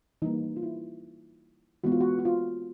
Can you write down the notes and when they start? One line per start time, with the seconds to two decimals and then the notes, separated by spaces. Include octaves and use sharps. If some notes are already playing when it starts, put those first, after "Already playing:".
0.22 E3 G3 A#3 D#4
0.56 F4
0.62 E4
1.84 E3 G#3 B3 F#4
1.92 F4
2.01 F#4
2.19 F#4
2.25 F4